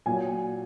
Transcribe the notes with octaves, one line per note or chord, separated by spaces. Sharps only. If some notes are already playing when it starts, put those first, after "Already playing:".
A#2 F#3 G#5